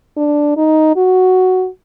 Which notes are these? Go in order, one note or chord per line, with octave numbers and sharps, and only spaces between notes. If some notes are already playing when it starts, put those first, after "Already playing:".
D4
D#4
F#4